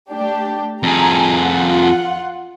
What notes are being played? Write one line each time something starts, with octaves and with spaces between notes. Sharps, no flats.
A3 D4 G4
F2 G#4 G#5 A#5
F4 F#5